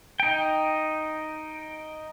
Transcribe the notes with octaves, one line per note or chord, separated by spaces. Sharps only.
D#4 G5